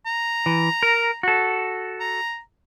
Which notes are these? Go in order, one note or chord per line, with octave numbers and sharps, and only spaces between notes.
A#5
E3
A#4
F#4 A4
A#5